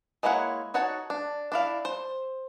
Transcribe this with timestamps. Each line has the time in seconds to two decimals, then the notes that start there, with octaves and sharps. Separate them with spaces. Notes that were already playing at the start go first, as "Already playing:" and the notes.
0.23 G#3 A#3 E4 C#5 F#5
0.74 D#4 F#4 C#5 F#5 A5
1.10 D4
1.52 D4 E4 F5
1.85 C5